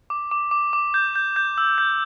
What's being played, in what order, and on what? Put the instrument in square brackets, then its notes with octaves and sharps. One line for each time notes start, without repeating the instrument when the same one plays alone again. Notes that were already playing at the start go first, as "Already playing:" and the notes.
[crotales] D6
D6
D6
D6
G6
G6
G6
E6
G6